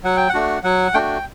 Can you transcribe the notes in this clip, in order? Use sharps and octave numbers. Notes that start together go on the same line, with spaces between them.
F#3 F#5
G5
F#5
A3 D4 F#4
F#3 F#5
A3 D4 F#4 G5